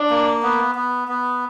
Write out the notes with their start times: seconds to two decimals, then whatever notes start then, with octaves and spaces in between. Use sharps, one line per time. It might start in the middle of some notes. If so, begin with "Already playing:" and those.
Already playing: D4
0.10 A#3
0.43 B3
0.75 B3
1.08 B3